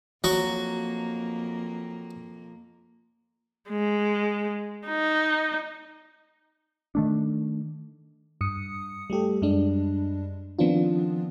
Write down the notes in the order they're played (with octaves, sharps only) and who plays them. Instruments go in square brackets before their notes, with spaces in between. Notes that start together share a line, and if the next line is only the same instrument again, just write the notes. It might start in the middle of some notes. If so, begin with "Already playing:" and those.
[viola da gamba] F2 A#3 [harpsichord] F#3 F#4
[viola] G#3
D#4
[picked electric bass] D#3 A3 D4
[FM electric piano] G2 D#6 C#7
G3 A3 G4 A4
F#2 G3 G#3 D4
D#3 F3 B3 C4 D4 F4